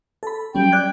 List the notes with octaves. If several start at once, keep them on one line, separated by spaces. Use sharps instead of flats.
A4 B5
F#3 G3 C#4 G5
D5 F#6 G#6